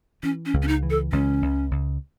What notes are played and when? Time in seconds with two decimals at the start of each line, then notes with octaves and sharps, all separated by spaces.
0.23 E3 C#4
0.46 C#4
0.54 C#2
0.62 C#4
0.68 D#4
0.83 E3
0.90 A4
1.12 C#2 C#4
1.42 C#2
1.71 C#2